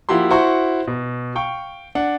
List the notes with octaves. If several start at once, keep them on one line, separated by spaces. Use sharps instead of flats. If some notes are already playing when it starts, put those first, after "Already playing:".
F3 A#3 E4 F#4 G4 C6
E4 F#4 C5 E5 C6 C#6
B2
F5 G5 C#6
D4 F#5